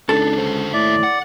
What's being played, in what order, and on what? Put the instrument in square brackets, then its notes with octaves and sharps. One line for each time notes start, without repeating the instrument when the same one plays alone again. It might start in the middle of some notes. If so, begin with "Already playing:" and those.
[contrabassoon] C#2 [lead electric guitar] D4 D#4 [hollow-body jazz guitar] A4
[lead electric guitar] D3 C5
[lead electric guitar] D#2 E5 [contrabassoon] A2 [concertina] D5
[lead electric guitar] F#5